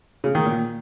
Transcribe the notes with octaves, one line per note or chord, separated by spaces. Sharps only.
C#3
D#3
A#2